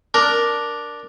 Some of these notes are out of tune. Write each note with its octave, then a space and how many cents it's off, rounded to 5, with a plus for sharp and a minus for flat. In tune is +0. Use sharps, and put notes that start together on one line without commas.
D4 +0 A#4 +5